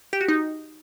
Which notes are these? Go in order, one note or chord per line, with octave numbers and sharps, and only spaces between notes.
G4
F#4
D#4